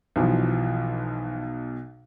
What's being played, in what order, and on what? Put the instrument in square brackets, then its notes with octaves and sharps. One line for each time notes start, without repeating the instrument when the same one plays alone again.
[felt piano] B1 B2 [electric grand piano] E3 F3